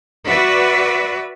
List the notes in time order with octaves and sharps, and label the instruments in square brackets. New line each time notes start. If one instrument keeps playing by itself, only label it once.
[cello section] F#4 B4 D5 E5